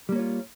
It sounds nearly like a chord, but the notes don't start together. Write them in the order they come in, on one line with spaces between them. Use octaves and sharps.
G3 A#3 C#5 F4